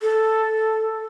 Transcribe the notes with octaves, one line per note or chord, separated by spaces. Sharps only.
A4